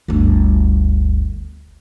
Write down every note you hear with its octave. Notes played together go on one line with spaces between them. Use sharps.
G1 D2